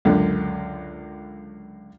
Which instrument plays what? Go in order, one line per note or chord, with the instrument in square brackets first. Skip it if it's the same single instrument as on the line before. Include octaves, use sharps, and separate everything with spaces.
[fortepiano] C#2 F#2 D3